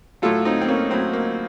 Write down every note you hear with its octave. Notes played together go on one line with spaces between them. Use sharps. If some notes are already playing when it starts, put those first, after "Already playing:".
A2 F#3 F4 A4
C4 D#4
C4
A#3 C#4
A2 F#3 C4
A#3